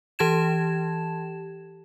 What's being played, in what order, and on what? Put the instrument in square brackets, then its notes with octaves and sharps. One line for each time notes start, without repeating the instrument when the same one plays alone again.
[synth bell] E3 G4 A5 G#6 E7